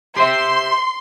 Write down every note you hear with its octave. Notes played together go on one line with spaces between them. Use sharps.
G4 C5 E5 C6